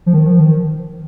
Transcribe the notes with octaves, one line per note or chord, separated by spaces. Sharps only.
F3
D#3
F3
D#3